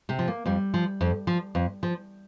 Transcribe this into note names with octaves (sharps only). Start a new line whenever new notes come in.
C3 C4
F3
A#3
F2 G3
F3
F2
F3
F2
F3